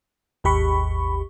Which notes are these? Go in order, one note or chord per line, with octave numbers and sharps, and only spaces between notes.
G#1 D#2 G4 B5 C#6